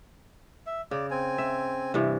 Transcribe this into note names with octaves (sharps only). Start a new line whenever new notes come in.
E5
C#3 D5
C4 G#5
E5
G2 C3 E3